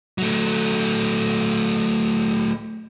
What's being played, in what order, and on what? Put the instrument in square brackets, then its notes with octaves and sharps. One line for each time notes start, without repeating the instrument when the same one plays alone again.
[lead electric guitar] F#3 A3